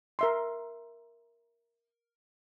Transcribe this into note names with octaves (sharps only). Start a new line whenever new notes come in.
A#4 E5 C6